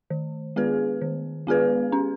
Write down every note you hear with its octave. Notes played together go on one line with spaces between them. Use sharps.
D#3
G#3 B3 G#4 B4
D#3
G#3 B3 G#4 B4
C#4